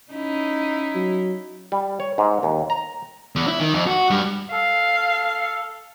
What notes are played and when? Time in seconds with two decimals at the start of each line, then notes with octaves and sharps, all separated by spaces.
0.11 C#4 D#4 E4
0.95 F#3
1.72 G3
2.00 C#5
2.18 G#2
2.43 D#2
2.70 A#5
3.36 E2
3.48 E4
3.60 D#3
3.73 F2
3.87 F#4
4.10 G2
4.52 A4 F5